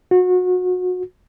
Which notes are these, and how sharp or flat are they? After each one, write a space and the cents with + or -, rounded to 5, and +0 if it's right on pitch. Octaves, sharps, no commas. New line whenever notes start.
F#4 -30